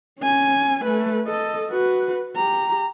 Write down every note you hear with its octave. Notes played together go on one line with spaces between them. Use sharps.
C#4 G#5
A3 B4
A4 D#5
F#4 B4
G4 A#5